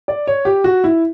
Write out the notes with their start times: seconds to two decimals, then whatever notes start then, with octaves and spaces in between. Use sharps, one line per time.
0.08 D5
0.27 C#5
0.45 G4
0.64 F#4
0.84 E4